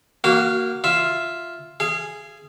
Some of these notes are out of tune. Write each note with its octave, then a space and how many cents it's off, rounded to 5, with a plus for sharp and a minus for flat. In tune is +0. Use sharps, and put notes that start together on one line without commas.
A#3 +0 F#4 +10 F5 -30
F4 +0 E5 +0
G#4 +0 F5 -40